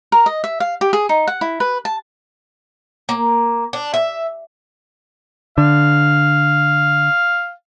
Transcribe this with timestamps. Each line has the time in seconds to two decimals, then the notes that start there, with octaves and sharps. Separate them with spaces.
0.12 A#4
0.26 D#5
0.44 E5
0.60 F5
0.81 G4
0.93 G#4
1.09 D#4
1.27 F#5
1.41 E4
1.60 B4
1.85 A5
3.09 A#3
3.73 D4
3.94 E5
5.58 D3 F5